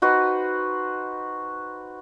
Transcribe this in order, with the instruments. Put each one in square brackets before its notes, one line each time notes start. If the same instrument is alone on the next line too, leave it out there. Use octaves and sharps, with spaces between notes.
[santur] D#4 F#4 B4 C5